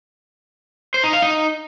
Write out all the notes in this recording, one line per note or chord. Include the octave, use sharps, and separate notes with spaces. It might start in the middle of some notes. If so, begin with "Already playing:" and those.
C5
D#4
F5
D#4